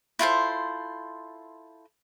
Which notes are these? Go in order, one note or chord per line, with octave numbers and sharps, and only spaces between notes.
E4 F4 A4 C5